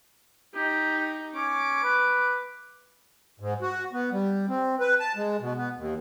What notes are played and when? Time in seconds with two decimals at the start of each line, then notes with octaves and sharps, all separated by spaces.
0.55 D#4 G4
1.35 C#4 D6
1.84 B4
3.40 G#2
3.62 F#4
3.93 B3
4.12 G3
4.48 C4
4.80 B4
5.00 A5
5.16 G#3
5.41 B2
5.57 B3
5.77 D#2